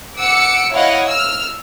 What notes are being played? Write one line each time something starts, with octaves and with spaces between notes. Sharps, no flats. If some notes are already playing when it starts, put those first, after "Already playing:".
F#5 D6 E6 C#7
E4 C#5 D#5 F5 F#5
E6 F6